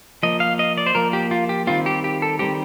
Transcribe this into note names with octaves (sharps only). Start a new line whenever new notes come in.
F3 A#3 D#5
F5
D#5
D5
C5
F3 A#3 A#4
G4
F4
G4
D#3 G3 C4 F4
G4
G4
A4
D#3 G3 C4 G4